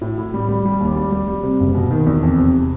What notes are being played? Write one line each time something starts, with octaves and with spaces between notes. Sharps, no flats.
A2
A2
G3
G3
G3
D#2
G3
G3
G3
C3
F#1
B2
D#3
E2
F2
C3